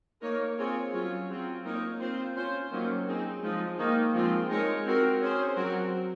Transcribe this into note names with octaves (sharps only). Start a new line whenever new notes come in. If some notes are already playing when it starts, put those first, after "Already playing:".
A#3 D#4 A#4 C#5
C4 F4 G#4 C#5
F#3 C#4 F4 G#4 C#5
F#3 C4 F4
A#3 D#4 A#4 C#5
C4 F4 C5
C#4 F4 C5
D#3 F#3 A#3 C#4 F4
C4 D#4 G#4
F3 G#3 D#4
D#3 A#3 D#4
F3 G#3 C4 F4
G#3 D#4 A#4 C#5
C4 F#4 A#4
C#4 G#4 C5
F#3 C4 F#4 A#4